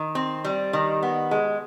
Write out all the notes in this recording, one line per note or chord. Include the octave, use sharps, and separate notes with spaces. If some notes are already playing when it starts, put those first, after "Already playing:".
Already playing: D#3
C4
G3
D#3
B3
G#3